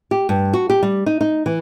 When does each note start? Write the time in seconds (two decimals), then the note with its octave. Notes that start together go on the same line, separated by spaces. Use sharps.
0.11 G4
0.29 G2
0.53 F#4
0.70 G4
0.83 G3
1.06 D#4
1.21 D#4
1.46 E3